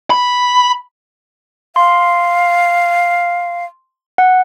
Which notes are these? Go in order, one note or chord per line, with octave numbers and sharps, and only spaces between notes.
B5
F5 C6
F#5